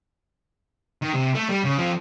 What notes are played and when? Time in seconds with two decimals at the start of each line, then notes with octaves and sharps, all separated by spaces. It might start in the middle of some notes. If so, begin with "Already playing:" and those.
1.02 D#3
1.14 C3
1.35 A3
1.49 G3
1.64 C#3
1.78 F3 C4